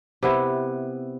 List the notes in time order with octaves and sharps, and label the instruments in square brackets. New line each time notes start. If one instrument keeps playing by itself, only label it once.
[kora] C3 B3 E4